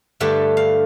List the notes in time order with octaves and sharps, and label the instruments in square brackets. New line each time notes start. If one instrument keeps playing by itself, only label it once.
[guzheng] G2 D3 A3 G4
F5